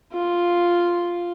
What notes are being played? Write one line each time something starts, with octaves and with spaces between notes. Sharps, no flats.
F4